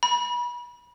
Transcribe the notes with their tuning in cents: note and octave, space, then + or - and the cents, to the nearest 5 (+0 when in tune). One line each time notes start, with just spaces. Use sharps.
B5 -30